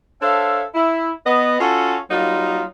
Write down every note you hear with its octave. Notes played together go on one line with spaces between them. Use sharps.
D4 A4 C5 C#5 E5 F5
E4
B3 D#5
C#4 F4 F#4 A4
F#3 G3 A#3 D#4 F4